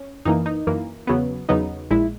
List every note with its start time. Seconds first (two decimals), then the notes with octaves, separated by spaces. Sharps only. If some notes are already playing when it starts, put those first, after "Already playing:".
Already playing: C#4
0.25 F#2 E3 A#3 D#4
0.46 D#4
0.67 F#2 E3 A#3
1.07 E2 C#3 F#3 B3
1.49 E2 C#3 F#3 B3 D#4
1.90 A#1 A#2 G#3 E4